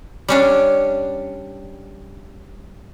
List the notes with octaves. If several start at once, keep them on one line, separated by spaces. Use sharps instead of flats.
G3 C#4 D4